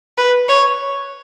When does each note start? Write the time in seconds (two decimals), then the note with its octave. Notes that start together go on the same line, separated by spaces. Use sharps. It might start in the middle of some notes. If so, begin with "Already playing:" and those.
0.18 B4
0.49 C#5